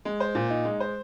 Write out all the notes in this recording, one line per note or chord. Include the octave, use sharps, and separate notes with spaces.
G#3
C5
A#2
D#4
G#3
C5